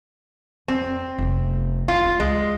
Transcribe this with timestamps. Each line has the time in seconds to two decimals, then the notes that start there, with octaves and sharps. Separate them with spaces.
0.68 F2 C4
1.18 F1 B3
1.88 E4 F4
2.05 C#4
2.20 C#2 G#3